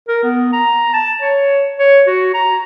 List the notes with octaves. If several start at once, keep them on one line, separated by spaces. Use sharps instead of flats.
A#4
B3
A#5
A5
C#5
C#5
F#4
A#5